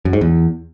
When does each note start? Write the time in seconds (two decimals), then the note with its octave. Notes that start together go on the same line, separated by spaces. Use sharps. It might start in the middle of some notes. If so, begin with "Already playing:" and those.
0.05 F#2
0.13 G#2
0.21 E2